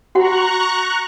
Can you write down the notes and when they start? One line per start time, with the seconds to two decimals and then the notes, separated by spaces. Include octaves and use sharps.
0.15 F#4 F#5 A#5 C#6 F#6